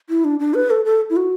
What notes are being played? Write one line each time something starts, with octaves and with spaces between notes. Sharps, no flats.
E4
D4
D4
B4
A4
A4
E4
F#4